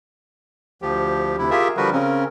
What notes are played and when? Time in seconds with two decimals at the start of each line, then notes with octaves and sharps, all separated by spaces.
0.82 D2 F3 G4
1.38 D2 C3 E4
1.51 F4 G4 G#4 A#4 E5
1.77 D3 F3 G3 F#4 A#4 B4
1.92 C#3 C4 C#4 A#4